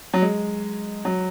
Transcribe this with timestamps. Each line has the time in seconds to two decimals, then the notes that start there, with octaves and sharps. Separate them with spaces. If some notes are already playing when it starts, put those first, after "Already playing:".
0.14 F#3
0.22 G#3
1.05 F#3